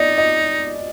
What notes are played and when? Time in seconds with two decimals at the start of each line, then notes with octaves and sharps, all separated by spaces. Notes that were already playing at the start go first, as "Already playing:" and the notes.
Already playing: D#4 D5 D#5
0.18 D#5